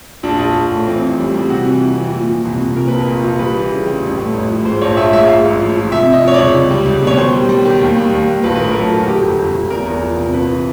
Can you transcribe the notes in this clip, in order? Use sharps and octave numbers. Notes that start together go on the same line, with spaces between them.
A#1 D4
A#1
A#1
A2
E3 C4
A1
G3
G3
C3 F#4
E3
F2
E3
A#2
F3
C2
C2
A#2 A#4
A#1 B4
A#4
A#1
A#1
G3 B4
E3
C#3
G3
A1
A2
A1
F3
G#2 C5
A#1 C#5
A#1 E5
G#2 E5
G#2 F5
A1
F3
F3
C3 E5
C3
D#5
F3 C#5
C#2 D5
C#2
G3
C#2
B2 C#5
D#3 C5
G3
G3
D#3
D#2
G3
D#2
D#2
A#1 B4
B4
A2 A#4
A#4
F#3 A4
A#1
F#4
D3 G4
G1
G1
G1
E2 A#4
E2
F3
C3
A#1 B4
E3